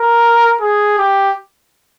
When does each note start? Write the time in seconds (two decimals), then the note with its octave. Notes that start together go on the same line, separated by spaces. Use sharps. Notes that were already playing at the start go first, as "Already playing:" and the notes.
Already playing: A#4
0.61 G#4
0.99 G4